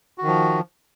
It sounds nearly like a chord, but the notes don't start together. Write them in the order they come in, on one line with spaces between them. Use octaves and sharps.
F#4 D#3 F3